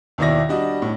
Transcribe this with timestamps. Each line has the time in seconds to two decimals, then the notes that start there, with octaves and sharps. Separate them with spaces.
0.18 D#2 B2 D#3 E4 D5 A#6
0.49 G3 D4 F#4 D#5
0.82 A2 D4